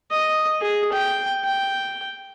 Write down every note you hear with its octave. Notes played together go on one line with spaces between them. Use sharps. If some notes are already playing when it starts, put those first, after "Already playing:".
D#5
G#4
G5
G5